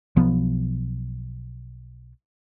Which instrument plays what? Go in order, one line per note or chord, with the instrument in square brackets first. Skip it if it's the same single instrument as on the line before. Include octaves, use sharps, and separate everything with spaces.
[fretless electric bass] B1 F3 B3